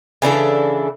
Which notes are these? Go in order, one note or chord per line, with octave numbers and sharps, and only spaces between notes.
C#3 E3 D4 A4